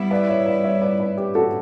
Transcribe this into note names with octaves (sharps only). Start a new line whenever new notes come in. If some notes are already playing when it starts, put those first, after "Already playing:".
Already playing: G3 B3 E4
B4 D5
C#5 E5
B4 D5
C#5 E5
B4 D5
B4 D5
G4 B4
F#4 A4